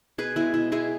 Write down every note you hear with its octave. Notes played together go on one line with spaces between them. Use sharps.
B2 G#4 B4
G#3 B3 E4 G#4
B2 E4
G#3 B3 E4 G#4